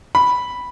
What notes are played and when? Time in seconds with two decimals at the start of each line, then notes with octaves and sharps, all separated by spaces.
0.15 B5